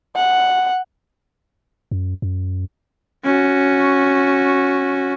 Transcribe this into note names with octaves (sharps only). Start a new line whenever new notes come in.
F#5
F#2
F#2
C#4 F#4